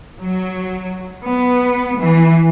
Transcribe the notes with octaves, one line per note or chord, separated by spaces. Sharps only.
F#3
B3
E3